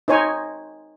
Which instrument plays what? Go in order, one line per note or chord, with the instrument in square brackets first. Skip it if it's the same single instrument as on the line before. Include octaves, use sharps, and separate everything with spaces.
[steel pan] D#4 C5 C#5 G#5